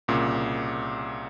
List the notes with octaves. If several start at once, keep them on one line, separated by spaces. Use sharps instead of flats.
C2 A#2 C#3